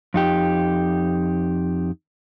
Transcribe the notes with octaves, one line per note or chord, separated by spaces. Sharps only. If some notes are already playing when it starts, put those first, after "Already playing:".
F2 D#4 G4